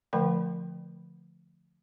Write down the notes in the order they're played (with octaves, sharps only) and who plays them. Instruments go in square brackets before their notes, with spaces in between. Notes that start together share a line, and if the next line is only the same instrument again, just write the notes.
[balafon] D3 F3 A3 A#4 G5 B5